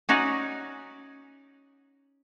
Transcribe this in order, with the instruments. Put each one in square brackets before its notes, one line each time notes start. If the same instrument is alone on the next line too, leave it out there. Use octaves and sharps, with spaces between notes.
[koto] C#4 D#4 F#4 D5